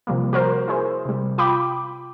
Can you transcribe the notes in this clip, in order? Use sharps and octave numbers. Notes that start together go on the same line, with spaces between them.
C3 F3 G3 A#3
F#4 A#4 C5
E4 G#4 C5
C3 G3
F4 G5 B5 D6